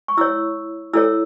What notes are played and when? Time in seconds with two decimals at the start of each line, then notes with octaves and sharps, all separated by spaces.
0.08 C#6
0.17 E4 C#5 E6
0.93 E4 A4 C#5 E6